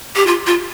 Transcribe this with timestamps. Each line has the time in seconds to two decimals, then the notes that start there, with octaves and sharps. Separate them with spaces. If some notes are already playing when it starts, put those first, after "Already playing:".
0.16 G4
0.27 F4
0.47 F4